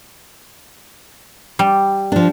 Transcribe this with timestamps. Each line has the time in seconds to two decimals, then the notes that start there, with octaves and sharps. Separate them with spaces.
1.59 G3
2.12 F3 D4